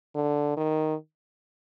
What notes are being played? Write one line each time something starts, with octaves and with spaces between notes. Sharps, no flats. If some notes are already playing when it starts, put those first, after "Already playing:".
D3
D#3